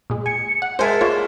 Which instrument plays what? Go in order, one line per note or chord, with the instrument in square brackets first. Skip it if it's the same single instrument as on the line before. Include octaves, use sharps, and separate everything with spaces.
[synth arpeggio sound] A#2 G#3
[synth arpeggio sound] G#5 [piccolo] C#7
[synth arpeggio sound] F#5
[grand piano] G#3 A#4 E5 [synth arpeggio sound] C5 G#5 [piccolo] A5
[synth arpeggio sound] A#3 F4 C#5